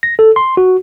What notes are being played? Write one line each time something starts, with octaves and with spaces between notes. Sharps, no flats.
A#6
A4
C6
F#4